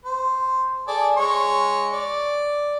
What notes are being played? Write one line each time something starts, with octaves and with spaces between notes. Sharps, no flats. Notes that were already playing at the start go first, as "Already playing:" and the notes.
C5
G#4 A4 D5
G#3 C#5 C#6
D5